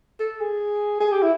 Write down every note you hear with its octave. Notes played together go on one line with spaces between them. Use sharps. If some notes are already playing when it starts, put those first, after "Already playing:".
A4
G#4
G#4
G4
E4